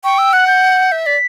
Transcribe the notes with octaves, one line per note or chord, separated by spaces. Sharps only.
G5 C#6
E6
F#5 F#6
G6
E5
D5 B6